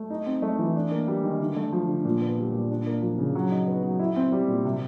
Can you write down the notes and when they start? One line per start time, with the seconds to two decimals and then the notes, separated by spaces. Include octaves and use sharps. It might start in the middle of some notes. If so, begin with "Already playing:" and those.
Already playing: A3
0.10 D#4
0.26 C4
0.42 A3
0.59 E3
0.76 D4
0.92 A#3
1.07 G3
1.23 D#3
1.40 D3
1.56 A3
1.72 F3
1.88 D3
2.05 A#2
2.21 B3
2.38 G3
2.54 A#2
2.70 D4
2.87 A#3
3.02 F3
3.18 C#3
3.35 F#3
3.51 D#4
3.67 B3
3.83 F#3
3.99 E4
4.16 C4
4.32 G3
4.48 A#2
4.65 C3